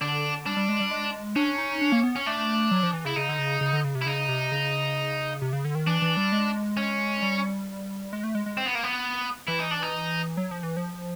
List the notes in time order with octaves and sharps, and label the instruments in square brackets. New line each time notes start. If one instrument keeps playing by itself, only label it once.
[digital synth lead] D3 [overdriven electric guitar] D4
[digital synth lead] G3 [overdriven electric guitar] D4
[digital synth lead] G3
G#3
G3
G#3
[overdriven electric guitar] C#4 [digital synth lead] D4
[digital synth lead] D#4
D4
A#3
B3
[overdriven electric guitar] C#4
[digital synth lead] A3 [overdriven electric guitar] D4
[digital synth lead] F#3
F3
E3
[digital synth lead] C#3 [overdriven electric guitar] E4
[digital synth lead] C#3 [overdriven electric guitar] D#4
[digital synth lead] D3
C#3
C#3
D3
C#3
C3
[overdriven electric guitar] E4
[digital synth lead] C#3 [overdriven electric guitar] D#4
[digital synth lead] C3
C#3
C3
C#3
D3
D#3
[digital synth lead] E3 [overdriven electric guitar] D4
[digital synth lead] E3
G3
G#3
[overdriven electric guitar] C#4
[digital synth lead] G3
G#3
A3
G#3
G#3
[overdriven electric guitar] C4
B3
A#3
B3
[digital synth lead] E3 [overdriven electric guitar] E4
[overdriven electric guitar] D#4
D4
D#4
[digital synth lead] F#3
F3
E3
F3